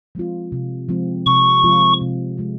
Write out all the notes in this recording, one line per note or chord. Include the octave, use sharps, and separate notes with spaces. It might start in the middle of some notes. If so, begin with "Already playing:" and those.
F3 G#3 C4 F4
C3
F3 G#3 C4 F4
C3 C#6
F3 G#3 C4 F4
C3
F3 G#3 C4 F4